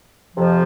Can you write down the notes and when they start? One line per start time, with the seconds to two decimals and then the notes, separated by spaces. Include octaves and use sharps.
0.36 F2 C3 F3